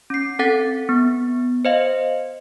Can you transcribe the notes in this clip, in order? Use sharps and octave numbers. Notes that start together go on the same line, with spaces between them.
C#4 C7
C4 A4 F#5 A6
B3
C5 D#5 F5